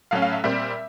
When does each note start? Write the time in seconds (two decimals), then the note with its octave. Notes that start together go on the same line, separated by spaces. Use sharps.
0.11 A2 F#3 A3 C#4 F5
0.22 F5
0.32 E5
0.44 A#2 G3 C4 E5